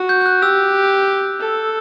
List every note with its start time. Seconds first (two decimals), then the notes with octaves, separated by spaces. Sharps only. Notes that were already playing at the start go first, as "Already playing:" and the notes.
Already playing: F#4
0.09 G6
0.21 G6
0.26 F#6
0.42 G4 E6
1.40 A4